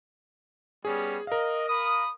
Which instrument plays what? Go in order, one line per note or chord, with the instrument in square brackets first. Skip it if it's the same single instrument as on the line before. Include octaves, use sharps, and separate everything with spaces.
[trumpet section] G3 B3 C#4 [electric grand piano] G#4
[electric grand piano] A#4 F5 [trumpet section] D#5
[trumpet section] B5 D#6